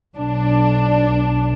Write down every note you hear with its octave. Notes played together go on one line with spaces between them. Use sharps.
B1 D4